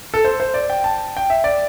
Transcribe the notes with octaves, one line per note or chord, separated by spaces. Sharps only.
A4
C5
C5
D5
G5
A5
G5
E5
D5